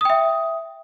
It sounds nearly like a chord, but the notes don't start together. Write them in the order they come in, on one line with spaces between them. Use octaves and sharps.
D#6 G5 E5